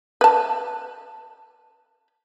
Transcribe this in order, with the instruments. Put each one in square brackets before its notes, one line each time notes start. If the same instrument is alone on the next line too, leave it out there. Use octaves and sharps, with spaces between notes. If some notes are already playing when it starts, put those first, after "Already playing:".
[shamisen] B4 A5